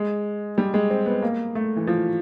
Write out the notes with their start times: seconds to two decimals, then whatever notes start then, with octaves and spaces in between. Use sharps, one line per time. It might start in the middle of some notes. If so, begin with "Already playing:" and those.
Already playing: G#3
0.58 G3
0.74 G#3
0.90 C4
1.06 B3
1.22 A#3
1.55 A3
1.77 E3
1.87 F3